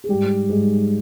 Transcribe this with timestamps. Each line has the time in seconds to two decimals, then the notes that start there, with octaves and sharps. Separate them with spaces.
0.04 G#4
0.09 G#2 G3 G4
0.49 G#2 G3 G#4